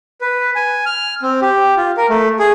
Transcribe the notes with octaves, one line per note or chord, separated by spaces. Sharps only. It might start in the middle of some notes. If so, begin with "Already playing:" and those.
B4
G#5
F6
C4
G4
F4
A#4
A3
G#4